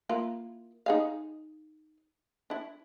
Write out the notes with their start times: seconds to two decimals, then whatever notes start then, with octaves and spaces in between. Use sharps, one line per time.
0.09 A#3 E4 F4
0.86 D#4 G#4 F5
2.50 D4 E4